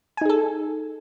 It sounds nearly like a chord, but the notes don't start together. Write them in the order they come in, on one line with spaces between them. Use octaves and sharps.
G#5 D#4 G#4 A4